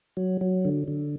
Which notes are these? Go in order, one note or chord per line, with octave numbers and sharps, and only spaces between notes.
F#3
F#3
D3
D3